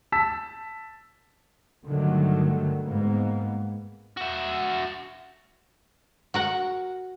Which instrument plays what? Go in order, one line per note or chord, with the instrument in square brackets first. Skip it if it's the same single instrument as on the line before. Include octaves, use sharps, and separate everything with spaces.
[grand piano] A5 E6 B6
[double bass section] G2 D3 D#3 F#3 A3
G#2 A#3 B3
[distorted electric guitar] F#4 E5
[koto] F#4 A#4 F#5